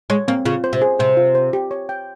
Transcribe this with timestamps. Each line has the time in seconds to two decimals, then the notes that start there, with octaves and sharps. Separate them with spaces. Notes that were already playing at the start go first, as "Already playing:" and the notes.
0.10 G#3 C#5
0.28 A#3 C4
0.46 C#3 F4
0.64 C5
0.73 C3
0.81 G#4
0.99 C3 C5
1.17 F4
1.35 C5
1.53 G4
1.71 C#5
1.89 G5